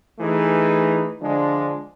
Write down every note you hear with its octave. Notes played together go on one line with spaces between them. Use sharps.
E3 A3 D#4 G#4 B4
D3 F3 G#3 D4